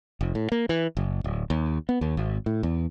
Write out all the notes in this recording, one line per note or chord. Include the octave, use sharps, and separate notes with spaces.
F1
A2
A#3
E3
F#1
D1
D#2
B3
D#2
G#1
A2
E2